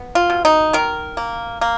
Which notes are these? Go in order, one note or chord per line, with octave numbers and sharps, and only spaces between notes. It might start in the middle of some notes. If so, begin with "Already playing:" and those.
Already playing: B3
F4
B2
D#4
D#3 A#4
A#3
A#3